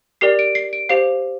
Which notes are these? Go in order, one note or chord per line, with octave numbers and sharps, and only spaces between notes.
G4 A#4 D5 C7
D7
C7
D7
G4 C5 F5 C7